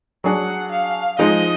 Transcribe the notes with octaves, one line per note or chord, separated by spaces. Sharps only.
F#3 D4 G#4 F#5
F5
F3 G#3 D#4 D#5